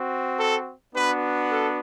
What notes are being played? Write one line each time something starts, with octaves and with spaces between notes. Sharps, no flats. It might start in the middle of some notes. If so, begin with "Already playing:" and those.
Already playing: C4 F#4
A4
B3 D4 F#4 B4
A4